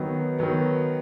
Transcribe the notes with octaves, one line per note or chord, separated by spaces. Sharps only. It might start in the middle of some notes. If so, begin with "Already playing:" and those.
Already playing: D#3 F#3 B3
D#3 F#3 B3